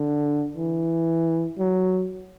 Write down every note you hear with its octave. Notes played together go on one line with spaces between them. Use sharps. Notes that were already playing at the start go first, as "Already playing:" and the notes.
Already playing: D3
E3
F#3